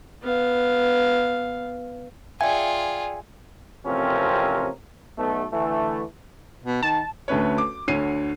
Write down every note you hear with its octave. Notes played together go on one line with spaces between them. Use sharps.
B3 F5
F4 G#4 D5 E5 G5 G#5
A1 C3 F3 C4 C#4 A#4
B1 B2 A3
D3 E3 A3
B2
D#3 A5
D2 A3 C#4 B4 C#5
D6
D2 D3 C#5 C7 D#7